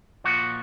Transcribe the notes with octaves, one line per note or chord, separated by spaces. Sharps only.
A#2 F3 F#4